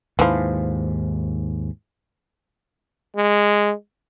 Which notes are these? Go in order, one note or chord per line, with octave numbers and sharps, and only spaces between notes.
D#2 G#2 E3 F3
G#3